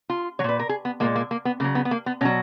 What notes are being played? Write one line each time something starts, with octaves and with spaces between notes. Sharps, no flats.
F4
F#3 C#5
A#2 B4
A#4
G#4
B3
A#2 G#3 A#3
A#3
A#3
B3
C#3 F#3 A#3
B3
B3
A#3
B3
B2 F#3 C#4